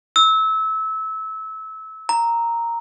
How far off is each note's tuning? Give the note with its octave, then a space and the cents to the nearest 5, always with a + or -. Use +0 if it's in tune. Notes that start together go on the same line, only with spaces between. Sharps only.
E6 -25
A#5 -5